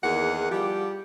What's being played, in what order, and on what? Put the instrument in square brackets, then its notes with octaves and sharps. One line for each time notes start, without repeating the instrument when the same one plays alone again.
[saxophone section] E2 D#3 A#3 G#4 F#5
F3 G3 G4